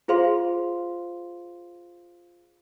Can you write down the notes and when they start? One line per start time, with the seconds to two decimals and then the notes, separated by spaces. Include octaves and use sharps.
0.08 F4 G#4 C5 F5 C6